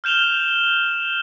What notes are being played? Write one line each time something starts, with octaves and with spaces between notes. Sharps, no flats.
F6 G6 E7 F7 G7